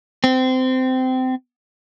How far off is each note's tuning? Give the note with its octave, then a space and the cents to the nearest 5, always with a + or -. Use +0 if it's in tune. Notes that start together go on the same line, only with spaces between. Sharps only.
C4 -20